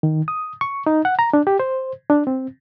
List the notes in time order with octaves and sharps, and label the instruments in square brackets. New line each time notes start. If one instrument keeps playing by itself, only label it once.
[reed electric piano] D#3
D#6
C#6
D#4
F#5
A#5
D4
G4
C5
D4
C4